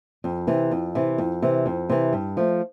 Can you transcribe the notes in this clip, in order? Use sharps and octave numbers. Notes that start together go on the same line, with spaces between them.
F2
C3 E3
F2
C3 E3
F2
C3 E3
F2
C3 E3
G2
F3 A3